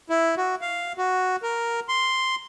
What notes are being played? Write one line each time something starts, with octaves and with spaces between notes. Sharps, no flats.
E4
F#4
F5
F#4
A#4
C6